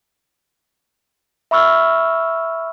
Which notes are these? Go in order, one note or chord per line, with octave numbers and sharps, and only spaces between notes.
E5 B5 C#6 E6 F6